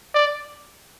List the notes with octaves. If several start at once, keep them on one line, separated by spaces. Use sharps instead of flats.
D5